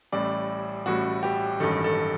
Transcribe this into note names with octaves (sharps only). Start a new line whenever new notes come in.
A1 A2 G3 D5
A1 A2 G3 F#4
G4
A1 G2 D#3 F#3 A4
A4